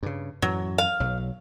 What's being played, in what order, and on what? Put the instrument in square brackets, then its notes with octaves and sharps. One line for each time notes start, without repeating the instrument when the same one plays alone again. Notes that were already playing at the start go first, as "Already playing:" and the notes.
[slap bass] G2 C#3
[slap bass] F#2 A2 E3 [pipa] F#3
[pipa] F5
[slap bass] B1 F#3